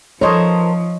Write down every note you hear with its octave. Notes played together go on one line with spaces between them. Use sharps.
F3 A#4 C5 C#5 D#5 A5